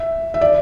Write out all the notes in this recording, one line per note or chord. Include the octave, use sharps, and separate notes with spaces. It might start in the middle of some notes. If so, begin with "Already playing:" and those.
Already playing: E5
E5
D5